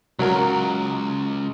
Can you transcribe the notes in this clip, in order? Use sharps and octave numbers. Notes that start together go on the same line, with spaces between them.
C#2 F#3 A#4